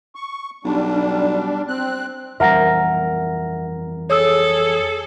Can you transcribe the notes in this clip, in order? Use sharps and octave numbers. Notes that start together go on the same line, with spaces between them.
C#6
B1 G3 D4
C4 F#6
F2 E3 G3 A#4 E5 F#5 A#5 A#6
G#4 A4 C#5 D#6 E6